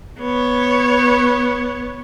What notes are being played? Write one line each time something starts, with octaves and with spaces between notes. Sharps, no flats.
B3 C#5